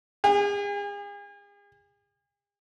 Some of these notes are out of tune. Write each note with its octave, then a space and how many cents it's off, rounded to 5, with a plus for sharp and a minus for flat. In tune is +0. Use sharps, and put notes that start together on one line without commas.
G#4 -40